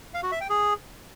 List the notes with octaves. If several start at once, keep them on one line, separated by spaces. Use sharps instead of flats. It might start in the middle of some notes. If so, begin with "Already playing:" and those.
F5
F#4
E5
G5
G#4